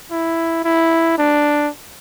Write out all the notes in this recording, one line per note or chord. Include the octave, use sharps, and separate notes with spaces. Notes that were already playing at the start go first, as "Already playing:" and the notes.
E4
E4
D4